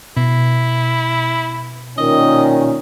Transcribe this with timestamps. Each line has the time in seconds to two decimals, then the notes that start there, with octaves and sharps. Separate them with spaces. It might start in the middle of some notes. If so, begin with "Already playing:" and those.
0.17 B2 E4
1.98 A#2 D#3 C#4 D#5